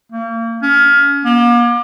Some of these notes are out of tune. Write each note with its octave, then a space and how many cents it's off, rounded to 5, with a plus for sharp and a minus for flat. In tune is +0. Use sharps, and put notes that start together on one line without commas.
A#3 -35
C#4 +30
A#3 +40